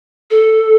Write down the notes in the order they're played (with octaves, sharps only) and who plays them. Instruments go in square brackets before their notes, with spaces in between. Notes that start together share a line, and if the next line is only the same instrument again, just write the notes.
[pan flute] A4